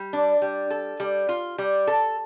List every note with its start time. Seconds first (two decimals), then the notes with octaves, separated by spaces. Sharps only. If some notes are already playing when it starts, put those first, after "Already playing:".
Already playing: G3
0.13 D4
0.42 G3
0.70 A4
1.00 G3
1.29 F4
1.58 G3
1.87 A4